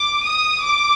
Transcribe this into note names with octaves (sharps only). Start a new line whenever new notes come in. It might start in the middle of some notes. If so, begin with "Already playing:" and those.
Already playing: D6
D#6
D6